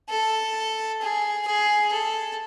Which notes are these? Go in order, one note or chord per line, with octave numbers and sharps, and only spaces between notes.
A4
G#4
G#4
A4